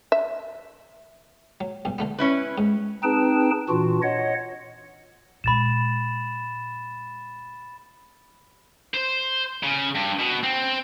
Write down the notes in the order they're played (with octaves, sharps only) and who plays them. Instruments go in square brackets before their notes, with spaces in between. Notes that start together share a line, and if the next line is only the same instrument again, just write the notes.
[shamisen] E5
[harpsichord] F#3
B1 G2
D3 A3 B3
[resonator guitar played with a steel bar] C#4 E4 B4
[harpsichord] G#2
[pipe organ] C4 D#4 G#4 B4 G5 A5
A#2 E3 D4 F4 F#4
C#5 D#5 F#5
[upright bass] A#2 G#3 [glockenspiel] B5 A6 E7
[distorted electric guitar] C5
C#3
G2
B2
C4